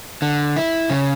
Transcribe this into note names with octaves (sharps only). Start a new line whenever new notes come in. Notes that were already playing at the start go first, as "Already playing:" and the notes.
D3
E4
C#3